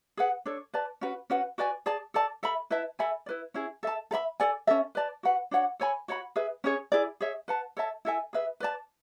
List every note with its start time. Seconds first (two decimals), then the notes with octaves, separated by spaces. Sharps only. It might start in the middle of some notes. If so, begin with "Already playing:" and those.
0.17 G#4 B4 F#5
0.46 D4 A4 C#5
0.74 B4 D5 A5
1.01 C#4 F#4 B4
1.30 C#4 F#4 B4 F#5
1.58 F#4 B4 D5 G#5
1.86 G#4 D5 A5
2.14 A4 D5 A5
2.43 A4 E5 B5
2.70 E4 B4 E5 A5
2.99 A4 E5 G#5 B5
3.26 E4 B4 D5
3.54 C#4 E4 G#4
3.83 A4 E5 A5
4.11 A4
4.13 E5 B5
4.40 A4 D5 G#5
4.67 C#4 F#4 A4 E5
4.95 B4 D5 A5
5.23 F#4 B4 F#5
5.51 D4 F#4 C#5 F#5
5.80 A4 C#5 G#5 B5
6.08 F#4 C#5 F#5 B5
6.36 G#4 B4 E5
6.64 C#4 G#4 C#5
6.92 E4 G#4 D5
7.21 G#4 C#5 E5
7.48 B4 F#5 A5
7.77 A4 C#5 E5 A5
8.05 E4 A4 E5 G#5
8.33 G#4 B4 E5
8.60 B4 D5 A5